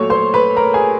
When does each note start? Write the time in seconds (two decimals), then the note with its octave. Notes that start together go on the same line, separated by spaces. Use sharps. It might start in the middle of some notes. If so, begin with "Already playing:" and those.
Already playing: A#2 F#3 A3 C#5 C#6
0.10 C5 C6
0.34 B4 B5
0.57 A#4 A#5
0.74 G#4 G#5